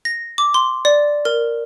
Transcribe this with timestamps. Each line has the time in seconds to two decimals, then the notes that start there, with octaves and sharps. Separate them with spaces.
0.05 A#6
0.38 D6
0.54 C6
0.85 D5
1.25 A#4